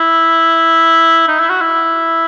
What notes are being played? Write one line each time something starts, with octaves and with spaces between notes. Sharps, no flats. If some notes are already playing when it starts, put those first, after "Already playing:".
Already playing: E4
D#4
E4
F#4
E4